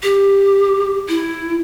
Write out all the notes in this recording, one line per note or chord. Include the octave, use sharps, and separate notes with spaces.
G4
E4